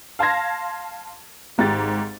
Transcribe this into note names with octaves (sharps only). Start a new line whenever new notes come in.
F5 A5 C6 G#6 A#6
G#1 G#2 G4 A6